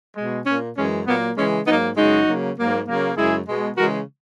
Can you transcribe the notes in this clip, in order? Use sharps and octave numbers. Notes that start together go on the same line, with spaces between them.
B2 G#3
A#2 A#3 C#4
F#2 E3 G#3 C#4
A#2 F#3 A#3 B3
C#3 E3 G#3 C#4
G#2 F#3 A#3 B3 D#4
F#2 C#3 G#3 D#4 F#4
C#3 F#3 A#3
G#2 F#3 A#3
C#3 F#3 A#3
F#2 C#3 G#3 E4 G#4
B2 G#3
C#3 E3 G#3 F#4 A#4